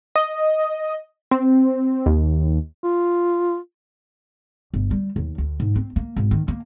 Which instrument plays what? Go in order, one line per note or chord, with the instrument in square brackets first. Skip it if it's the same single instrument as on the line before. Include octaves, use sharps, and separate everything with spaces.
[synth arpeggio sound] D#5
C4
D#2
[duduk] F4
[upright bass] G1
G3
D#2
D2
G#2
C4
A#3
G#1
D#3
A#3